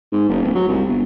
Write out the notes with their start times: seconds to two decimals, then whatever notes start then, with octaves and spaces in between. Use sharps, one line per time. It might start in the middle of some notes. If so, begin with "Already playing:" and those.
0.12 G#2
0.29 F#1
0.42 D1
0.55 F#3
0.68 C2
0.89 G1